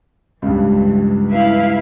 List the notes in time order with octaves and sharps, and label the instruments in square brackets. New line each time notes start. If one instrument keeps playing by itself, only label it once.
[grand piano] C#2 G2 [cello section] E3
[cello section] E4 B4 F5